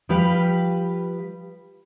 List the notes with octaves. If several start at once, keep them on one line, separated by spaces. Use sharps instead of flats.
F3 G3 G4 B4 F5